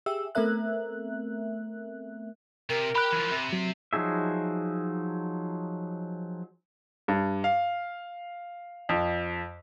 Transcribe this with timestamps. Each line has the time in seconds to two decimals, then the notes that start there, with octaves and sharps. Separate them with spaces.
0.06 G4 G#4 E5 E6
0.35 A3 B3 C4 A#4 E5 F#6
2.70 C3 A#4
2.95 G4 G5 B5 F#6
3.13 E3 F3
3.31 C3
3.53 F#3
3.93 F3 F#3 D#4 G#4 E5
7.08 G2
7.44 F5
8.89 F2